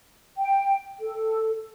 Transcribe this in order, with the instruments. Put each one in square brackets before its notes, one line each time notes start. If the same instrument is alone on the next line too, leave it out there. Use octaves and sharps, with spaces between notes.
[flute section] G5
A4